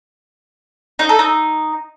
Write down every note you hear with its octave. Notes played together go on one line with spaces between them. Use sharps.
D#4
A4
D#4